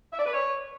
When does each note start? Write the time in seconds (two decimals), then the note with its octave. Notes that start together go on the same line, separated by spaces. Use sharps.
0.13 E5
0.19 D5
0.26 B4
0.33 C#5